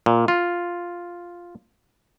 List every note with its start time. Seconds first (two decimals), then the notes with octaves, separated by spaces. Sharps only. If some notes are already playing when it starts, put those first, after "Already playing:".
0.06 A#2
0.28 F4